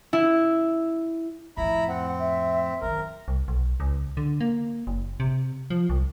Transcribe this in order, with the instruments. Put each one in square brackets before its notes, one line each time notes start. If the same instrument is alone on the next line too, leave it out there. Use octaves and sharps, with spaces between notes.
[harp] E4
[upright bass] F2 A2 [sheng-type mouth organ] E4 A#5 B5
[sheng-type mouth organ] C4 [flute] F#5
[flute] E5
[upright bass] F#2 D#3 [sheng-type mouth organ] A#4
[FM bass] C2
B1
C#2
D3
A#3
F#1
C3
F3
C2